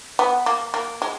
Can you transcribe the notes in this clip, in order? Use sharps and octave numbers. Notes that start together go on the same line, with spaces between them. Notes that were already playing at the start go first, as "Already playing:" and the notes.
B3
A#3
A#3
G#3